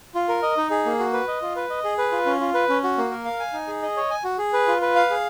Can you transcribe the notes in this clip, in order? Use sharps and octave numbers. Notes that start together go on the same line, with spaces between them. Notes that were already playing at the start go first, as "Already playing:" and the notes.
F4
A#4
D#5
D#4
G#4
A#3
F#4
B4
D#5
F4
B4
D#5
G#4
B4
F4
C#4
F4
B4
C#4
F#4
A#3
A#4
F5
G#5
D#4
G#4
D#5
C#5
G#5
F#4
G#4
B4
F4
B4
F5
G#4